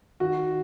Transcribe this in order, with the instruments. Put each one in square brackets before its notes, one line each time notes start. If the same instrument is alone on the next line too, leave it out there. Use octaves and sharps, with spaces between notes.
[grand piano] D#3 F#4